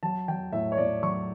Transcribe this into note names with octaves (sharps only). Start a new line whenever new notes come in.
F#3 A5
F#3 G5
A2 E5
C#5
A2 D5
F#3 C#6